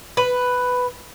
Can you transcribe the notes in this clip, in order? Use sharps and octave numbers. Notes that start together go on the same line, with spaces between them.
B4